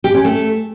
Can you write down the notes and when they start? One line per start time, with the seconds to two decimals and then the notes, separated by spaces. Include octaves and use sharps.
0.04 G4
0.14 C#4
0.25 A3